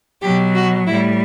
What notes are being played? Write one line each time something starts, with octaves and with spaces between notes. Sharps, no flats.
B2 F#3 G4
F#4
A2 G3 E4